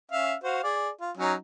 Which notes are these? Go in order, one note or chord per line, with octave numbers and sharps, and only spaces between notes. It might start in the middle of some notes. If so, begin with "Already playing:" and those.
C#4 E5 F5
F#4 C5 F5
G#4 D5
F4
F#3 C#4 D#4